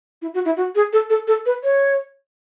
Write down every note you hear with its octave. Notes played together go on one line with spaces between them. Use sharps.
E4
F#4
E4
F#4
G#4
A4
A4
A4
B4
C#5